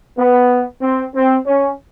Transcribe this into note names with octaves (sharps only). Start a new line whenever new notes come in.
B3
C4
C4
C#4